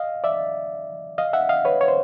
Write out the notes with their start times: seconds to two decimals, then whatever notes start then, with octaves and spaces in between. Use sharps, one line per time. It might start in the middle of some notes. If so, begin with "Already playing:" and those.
Already playing: D#5 F5
0.24 D5 E5
1.18 D#5 F5
1.33 E5 F#5
1.49 D#5 F5
1.65 B4 C#5
1.81 C#5
1.88 C5